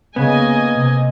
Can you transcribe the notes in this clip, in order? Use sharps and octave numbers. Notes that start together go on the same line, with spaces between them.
C#3 A#3 B3 D#5 G#5
C3